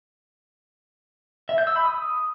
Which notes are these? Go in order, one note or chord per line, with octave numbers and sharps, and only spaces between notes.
E5
G6
E6
B5
D#6